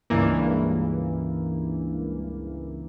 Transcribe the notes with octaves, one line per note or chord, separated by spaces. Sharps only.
C#2 G2 E3 A#3